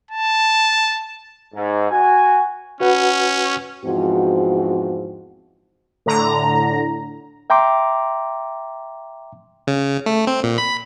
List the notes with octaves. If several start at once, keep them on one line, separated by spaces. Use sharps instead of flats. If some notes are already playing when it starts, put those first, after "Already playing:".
A5
G#2
F#4 G#5
C#4 F#4 B4 F#5
E2 G#2 F3 C4 F#4
A2 D3 A#5
E5 G5 A#5 C6 D6
C#3
A3
C4
A#2
B5